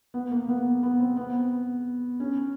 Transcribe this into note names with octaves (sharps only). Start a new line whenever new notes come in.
B3
A#3
B3
B3
C4
B3
C#4